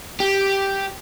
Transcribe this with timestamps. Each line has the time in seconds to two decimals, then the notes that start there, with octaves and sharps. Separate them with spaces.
0.20 G4